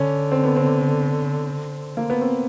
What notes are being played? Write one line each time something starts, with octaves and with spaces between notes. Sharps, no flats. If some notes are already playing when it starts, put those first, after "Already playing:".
Already playing: D3 C#4
C4
B3
C4
A#3
B3
C4